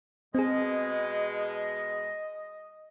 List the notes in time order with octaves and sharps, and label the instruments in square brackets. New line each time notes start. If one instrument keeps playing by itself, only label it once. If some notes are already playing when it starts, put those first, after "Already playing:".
[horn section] B2 G#3 [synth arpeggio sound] C4 G#4 [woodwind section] D#5